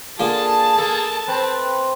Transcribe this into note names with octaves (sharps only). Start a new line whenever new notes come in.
D3 A#3 F4 G#4 A5
A#3 A4
C4 B4